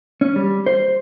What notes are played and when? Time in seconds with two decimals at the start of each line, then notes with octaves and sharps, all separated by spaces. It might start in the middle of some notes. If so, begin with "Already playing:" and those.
0.21 C#4
0.36 G3
0.66 C5